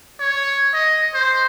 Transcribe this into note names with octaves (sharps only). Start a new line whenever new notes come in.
C#5
D#5
C5